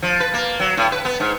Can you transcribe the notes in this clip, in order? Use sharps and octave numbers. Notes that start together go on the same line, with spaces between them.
F3
B4
A#3
F#3
A2
B4
B3
G#2